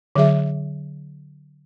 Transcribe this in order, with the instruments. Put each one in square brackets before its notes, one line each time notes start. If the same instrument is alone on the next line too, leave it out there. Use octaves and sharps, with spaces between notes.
[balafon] D3 F#3 G#4 E5